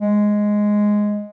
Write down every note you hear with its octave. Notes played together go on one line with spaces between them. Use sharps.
G#3